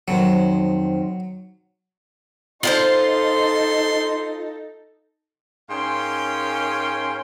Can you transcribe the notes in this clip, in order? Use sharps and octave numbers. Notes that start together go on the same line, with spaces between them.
F2 D#3 F#3 C5
D#4 F4 F#4 A4 C5 C6
G#2 C#4 A#4 F5 G5 C6